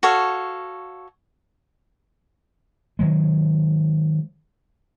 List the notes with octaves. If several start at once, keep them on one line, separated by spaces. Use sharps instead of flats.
F#4 A4 C#5 F5
D#3 F#3 G#3